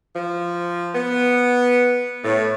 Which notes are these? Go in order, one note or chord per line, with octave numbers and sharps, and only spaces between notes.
F3
B3
A2